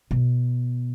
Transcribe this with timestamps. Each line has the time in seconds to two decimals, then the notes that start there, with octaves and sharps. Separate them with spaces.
0.11 B2